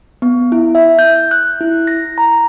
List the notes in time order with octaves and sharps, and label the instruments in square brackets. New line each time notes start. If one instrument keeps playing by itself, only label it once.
[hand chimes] B3
E4
E5
G6
F#6
E4
A#6
A#5